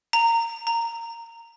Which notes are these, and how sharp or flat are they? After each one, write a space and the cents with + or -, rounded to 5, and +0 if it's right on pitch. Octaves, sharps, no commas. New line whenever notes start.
A#5 -20
A#5 -15